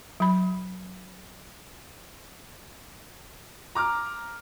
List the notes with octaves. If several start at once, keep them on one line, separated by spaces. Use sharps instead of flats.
F#3 B5
A#5 D6 F6